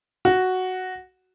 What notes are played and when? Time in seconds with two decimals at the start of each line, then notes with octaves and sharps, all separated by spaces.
0.25 F#4